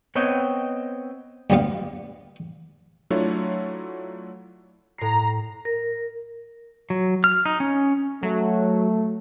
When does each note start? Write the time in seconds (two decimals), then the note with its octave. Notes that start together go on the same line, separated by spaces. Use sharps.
0.15 B3 C4 C#5 D#5 G5
1.50 D2 G2 G3 B3 F5
3.10 F#3 A3 D4 E4 F4 C#5
4.98 A2 A#5 C7
5.65 A#4
6.90 F#3
7.24 F6
7.46 D#4
7.60 C#4
8.23 F#3 A3